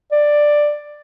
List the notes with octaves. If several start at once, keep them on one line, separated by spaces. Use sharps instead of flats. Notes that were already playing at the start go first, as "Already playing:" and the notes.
D5